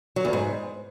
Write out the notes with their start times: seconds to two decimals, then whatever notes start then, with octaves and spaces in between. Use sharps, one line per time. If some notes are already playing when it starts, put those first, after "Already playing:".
0.16 F#3
0.25 E2
0.33 G#2